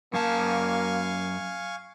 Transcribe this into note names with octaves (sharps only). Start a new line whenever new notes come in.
F#2 A#3 F5 G#5 A5 C#6